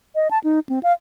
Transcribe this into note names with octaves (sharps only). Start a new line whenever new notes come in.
D#5
A5
D#4
C4
F5